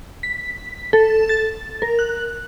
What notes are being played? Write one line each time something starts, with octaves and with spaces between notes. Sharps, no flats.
B6
A4
A6
A#4
F#6